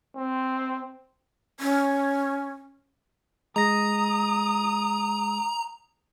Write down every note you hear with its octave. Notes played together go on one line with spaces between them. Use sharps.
C4
C#4
G#3 A#5 D#6 A#6